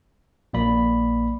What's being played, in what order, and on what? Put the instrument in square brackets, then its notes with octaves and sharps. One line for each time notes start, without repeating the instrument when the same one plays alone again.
[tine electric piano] A#1 A#3 D5 B5